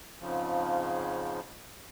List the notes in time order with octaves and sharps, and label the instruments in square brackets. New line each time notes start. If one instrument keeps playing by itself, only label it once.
[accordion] F2 G#2 C#3 F3